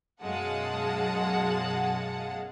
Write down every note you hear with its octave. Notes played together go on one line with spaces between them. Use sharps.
B1 F#2 G#3 F5 F#5 A5